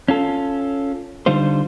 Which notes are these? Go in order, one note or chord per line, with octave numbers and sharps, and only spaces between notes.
C#4 F4 A4
D3 G3 D#4 F4 C5